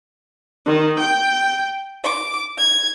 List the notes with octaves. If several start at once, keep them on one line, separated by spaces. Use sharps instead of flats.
D#3
G5
D6
G#6